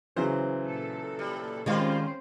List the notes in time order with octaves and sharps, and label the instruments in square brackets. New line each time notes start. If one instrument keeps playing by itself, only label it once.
[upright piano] C#3 E3 F#3 [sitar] C5
[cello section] A#2 A4
[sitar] G3
[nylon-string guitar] D#3 G#3 F5 [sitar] G3 F4 [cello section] C4 C#4 C5